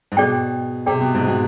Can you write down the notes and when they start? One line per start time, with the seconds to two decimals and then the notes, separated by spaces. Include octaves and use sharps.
0.12 G#2
0.17 B2 G#4 D5 G5
0.86 C3 G#4 D5 G5
1.01 B2
1.14 G#2
1.28 B2